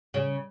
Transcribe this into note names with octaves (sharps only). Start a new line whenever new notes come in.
C#3